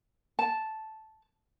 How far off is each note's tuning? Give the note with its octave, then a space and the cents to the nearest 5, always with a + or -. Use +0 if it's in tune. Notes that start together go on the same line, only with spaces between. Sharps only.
A5 -5